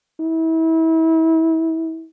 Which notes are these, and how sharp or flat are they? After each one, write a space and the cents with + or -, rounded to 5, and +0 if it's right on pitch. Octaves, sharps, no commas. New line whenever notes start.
E4 -30